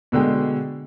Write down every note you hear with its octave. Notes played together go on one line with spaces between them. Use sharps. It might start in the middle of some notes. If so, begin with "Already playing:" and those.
B2 D3 G#3 G5